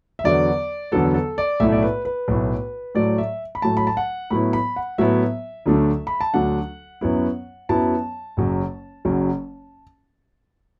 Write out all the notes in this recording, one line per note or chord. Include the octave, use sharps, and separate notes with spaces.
E5
E2 D3 F#3 B3 D5
E2 D3 F#3 B3 A4
A4
D5
B1 A2 A3 E4 E5
D5
B4
B4
B1 A2 A3 E4
A2 F#3 A3 D5
E5
B5
A2 F#3 A3 A5
B5
A5
F#5
A2 F#3 B3 E4 B5
B5
F#5
A2 F#3 B3 E4 E5
D2 D3 F#3 A3 D4
B5
A5
D2 D3 F#3 A3 D4 F#5
F#2 F#3 B3 E4
F#2 F#3 B3 E4 A5
F#1 F#2 F#3
F#1 F#2 F#3